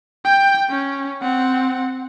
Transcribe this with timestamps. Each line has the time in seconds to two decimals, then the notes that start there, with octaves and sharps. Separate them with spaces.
0.24 G5 G6
0.70 C#4
1.22 C4 F#5